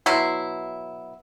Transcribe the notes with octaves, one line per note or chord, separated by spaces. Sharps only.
B2 F#3 E4 C6